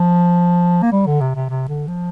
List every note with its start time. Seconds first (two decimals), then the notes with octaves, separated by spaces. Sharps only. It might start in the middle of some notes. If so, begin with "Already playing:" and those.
Already playing: F3
0.82 A#3
0.92 G3
1.06 D3
1.21 C3
1.35 C3
1.49 C3
1.69 D3
1.87 F3